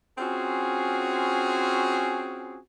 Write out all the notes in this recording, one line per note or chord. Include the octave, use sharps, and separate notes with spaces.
C4 C#4 F4 F#4 G#4